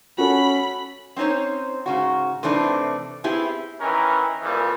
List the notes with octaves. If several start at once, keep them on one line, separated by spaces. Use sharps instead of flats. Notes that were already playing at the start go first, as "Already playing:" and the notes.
C#4 F#4 A4 B5
C4 C#4 D#4 C5 C#5
G#2 C#3 F#4
C3 E3 A3 C4 D4 D#4
B3 C4 E4 G4 G#4
D#3 E3 C#4 A#4
F2 A#2 E3 G3